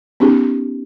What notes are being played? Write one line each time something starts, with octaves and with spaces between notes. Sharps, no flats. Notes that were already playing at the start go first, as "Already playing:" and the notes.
B3 C#4 D#4 G4 G#4